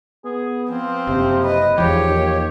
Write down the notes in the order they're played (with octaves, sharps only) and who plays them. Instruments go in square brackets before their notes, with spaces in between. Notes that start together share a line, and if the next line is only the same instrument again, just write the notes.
[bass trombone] B3 [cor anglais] G#4
[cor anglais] F3 [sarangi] C4
[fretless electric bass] F#1 [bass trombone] C3
[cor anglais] B4 [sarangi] D#5
[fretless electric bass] E2 F3 [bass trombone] G#2 [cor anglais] G4 [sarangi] C#5
[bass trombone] D#2